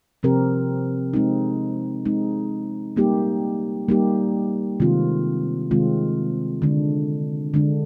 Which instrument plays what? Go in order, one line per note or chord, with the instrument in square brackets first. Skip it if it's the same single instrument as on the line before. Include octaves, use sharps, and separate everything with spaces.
[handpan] C3 F3 C4 G4 A#4
G#3 C4 D#4
G#3 C4 D#4
G3 A#3 D#4 G4
G3 A#3 D#4 G4
C3 D#3 G#3 C4 F4
C3 D#3 G#3 C4 F4
D3 G#3 D4
D3 G#3 D4